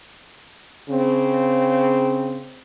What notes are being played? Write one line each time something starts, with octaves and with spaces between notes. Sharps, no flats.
C#3 C4